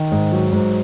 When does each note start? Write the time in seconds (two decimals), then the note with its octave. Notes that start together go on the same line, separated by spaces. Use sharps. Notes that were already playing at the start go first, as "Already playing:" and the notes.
Already playing: D#3
0.12 G#2
0.32 F#3
0.53 G#2